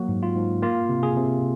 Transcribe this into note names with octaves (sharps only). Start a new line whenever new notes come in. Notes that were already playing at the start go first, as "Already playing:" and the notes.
Already playing: F#3 A#3 F#4
G#2
F4
G#2
A#3 F4
C3
G#4
C3